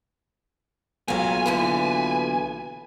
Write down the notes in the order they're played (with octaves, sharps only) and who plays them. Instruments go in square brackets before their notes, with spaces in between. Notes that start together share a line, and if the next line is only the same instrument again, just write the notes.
[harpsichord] B1 A#2 [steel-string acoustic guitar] F2 F#3 [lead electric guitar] G#5
[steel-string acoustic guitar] D3 E3 F3 [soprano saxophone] B4